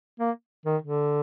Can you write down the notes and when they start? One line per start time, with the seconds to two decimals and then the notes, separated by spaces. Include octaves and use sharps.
0.20 A#3
0.66 D#3
0.82 D3